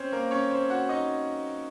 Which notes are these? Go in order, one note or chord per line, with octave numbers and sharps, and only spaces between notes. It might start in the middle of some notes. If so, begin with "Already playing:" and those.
Already playing: C4 C#4 C5 C#5
A#3 A#4
C#4 C#5
C4 C5
F#4 F#5
D#4 D#5